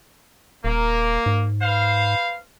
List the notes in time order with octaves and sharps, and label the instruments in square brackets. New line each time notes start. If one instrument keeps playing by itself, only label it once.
[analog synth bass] D#1 [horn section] A#3
[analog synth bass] G#2
[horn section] B4 C5 F5